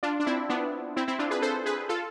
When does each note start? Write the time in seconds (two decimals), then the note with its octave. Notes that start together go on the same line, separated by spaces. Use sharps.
0.03 D4 F4
0.20 D4
0.26 C4 E4
0.49 B3 D4
0.96 C4 E4
1.08 C4 E4
1.19 D4 F4
1.31 G#4 B4
1.42 A4 C5
1.66 G#4 B4
1.89 F4 A4